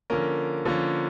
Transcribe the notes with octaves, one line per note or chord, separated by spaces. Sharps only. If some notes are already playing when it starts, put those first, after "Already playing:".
D3 F3 A#3 C#4 A#4
D3 F3 A#3 C#4